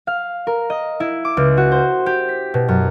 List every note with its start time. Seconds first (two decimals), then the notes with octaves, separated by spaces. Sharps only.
0.07 F5
0.47 A#4
0.70 D#5
1.00 E4
1.25 D6
1.37 C#2
1.57 F#4
1.72 C5
2.06 G4
2.29 B6
2.54 B2
2.68 F#2